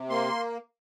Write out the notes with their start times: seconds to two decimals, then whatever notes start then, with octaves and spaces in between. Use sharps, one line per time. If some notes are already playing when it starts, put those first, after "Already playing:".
Already playing: C3
0.09 A#3 C6